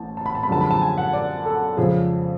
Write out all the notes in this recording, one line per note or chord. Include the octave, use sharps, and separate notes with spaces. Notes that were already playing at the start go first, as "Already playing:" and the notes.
Already playing: A1 A2 A5
A5
B5
A5
B5
F#2 D3 F3 G#3 A5
B5
A5
G#5
F#5
D5
A4
F2 C#3 F3 G#3 G#4